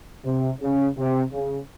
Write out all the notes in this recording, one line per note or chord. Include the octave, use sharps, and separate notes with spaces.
C3
C#3
C3
C#3